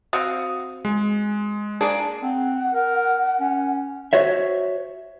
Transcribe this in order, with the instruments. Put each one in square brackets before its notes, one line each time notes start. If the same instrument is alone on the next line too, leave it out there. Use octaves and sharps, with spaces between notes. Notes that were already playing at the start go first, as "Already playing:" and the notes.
[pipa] C4 F#4 F5 [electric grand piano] D#6
[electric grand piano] G#3
[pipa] G#3 A#3 D4 [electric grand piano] G#4
[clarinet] C4 [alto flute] F#5
[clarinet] A#4
C#4
[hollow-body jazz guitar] F#4 C5 C#5 E5